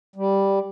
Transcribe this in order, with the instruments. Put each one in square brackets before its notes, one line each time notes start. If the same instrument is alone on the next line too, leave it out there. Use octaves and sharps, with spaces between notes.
[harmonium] G3